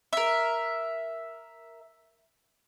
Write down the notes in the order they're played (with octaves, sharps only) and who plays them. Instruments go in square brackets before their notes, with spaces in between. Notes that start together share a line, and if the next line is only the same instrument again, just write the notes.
[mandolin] A#4 E5